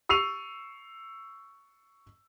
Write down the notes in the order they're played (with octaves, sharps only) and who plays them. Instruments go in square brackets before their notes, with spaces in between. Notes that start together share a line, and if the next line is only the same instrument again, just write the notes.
[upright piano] C#6 E6 C7 D#7 F7